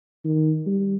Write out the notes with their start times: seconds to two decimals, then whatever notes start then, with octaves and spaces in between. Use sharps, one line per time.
0.25 D#3
0.66 G3